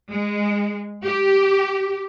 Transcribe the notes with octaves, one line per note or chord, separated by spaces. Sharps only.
G#3
G4